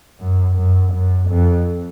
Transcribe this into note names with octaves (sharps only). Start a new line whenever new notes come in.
F#2
F#2
F#2
F2